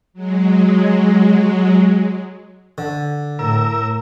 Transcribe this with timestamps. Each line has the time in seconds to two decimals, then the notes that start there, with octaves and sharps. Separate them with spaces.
0.13 F#3 G#3
2.78 D3
3.39 A2 A#4 E6